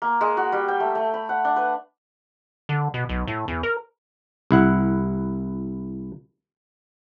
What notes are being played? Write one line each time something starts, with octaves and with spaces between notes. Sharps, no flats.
A#3
G#3
F#4
G3
G5
A3
A3
B5
F#5
D4
B4
D3
B2
B1
A2
E2
A#4
C2 E4 F#5